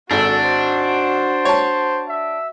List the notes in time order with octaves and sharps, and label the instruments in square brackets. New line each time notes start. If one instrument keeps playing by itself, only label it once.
[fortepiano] G#1 [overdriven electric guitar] D4 [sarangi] F#4 [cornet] A4
[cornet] C5
[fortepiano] C#5 A5
[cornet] E5